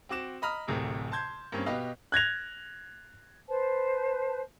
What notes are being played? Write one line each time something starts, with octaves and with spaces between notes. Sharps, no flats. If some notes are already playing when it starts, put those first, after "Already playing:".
C4 F#4 D6 E7
D#5 A#5 B5 D#6 F6
D1 A1 C3 A3 G#4 A#4
A5 C6 G6 G#6
G2 A#3 C4 C#4
B2 G4 B4 D#5 F5
F#6 G#6 A#6 F7
B4 C5 A5